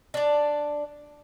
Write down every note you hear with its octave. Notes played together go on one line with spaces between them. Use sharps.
D4 D5